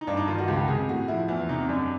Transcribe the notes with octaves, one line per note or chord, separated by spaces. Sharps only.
D#4
G2 D4
D#4
D#3 F4
F#4
C#2 G4
C3 G#4
A2 F#4
F3 E4
E2 E4
C3 D#4
F#2 D4